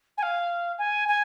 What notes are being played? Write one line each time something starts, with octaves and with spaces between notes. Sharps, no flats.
G#5
F5
G#5
G#5